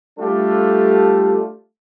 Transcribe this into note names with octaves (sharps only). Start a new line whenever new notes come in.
G3 A3 D4 F4 G4 A4